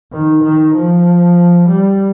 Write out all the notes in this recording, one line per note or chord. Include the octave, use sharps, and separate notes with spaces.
D#3
D#3
F3
G3